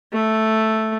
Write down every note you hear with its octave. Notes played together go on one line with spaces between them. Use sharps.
A3